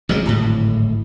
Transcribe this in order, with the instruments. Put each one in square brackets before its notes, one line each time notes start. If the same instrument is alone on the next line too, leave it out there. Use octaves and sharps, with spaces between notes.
[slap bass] A1 C3 F#3 G#3
D1 G#1 A2